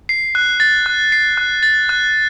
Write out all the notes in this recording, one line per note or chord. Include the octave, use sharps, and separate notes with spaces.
C7
F#6
A6
F#6
C7
F#6
A6
F#6